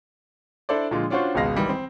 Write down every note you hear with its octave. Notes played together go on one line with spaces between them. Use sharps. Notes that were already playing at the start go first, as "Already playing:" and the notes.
D4 E4 A4 C5 D5
A#2 D3 F3 G#3 F4
C#4 D4 F4 F#4 C5 C#6
G#1 C#2 B2 G#3 F5 A#6
D#3 E3 G3 G#3
C4